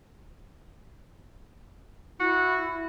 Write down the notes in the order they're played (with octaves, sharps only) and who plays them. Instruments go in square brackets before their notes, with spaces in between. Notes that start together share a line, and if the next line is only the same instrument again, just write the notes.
[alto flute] E4 [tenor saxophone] F#4